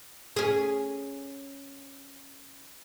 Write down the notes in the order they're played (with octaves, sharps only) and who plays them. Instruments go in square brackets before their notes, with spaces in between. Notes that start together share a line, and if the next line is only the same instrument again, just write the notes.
[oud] C#4 G#4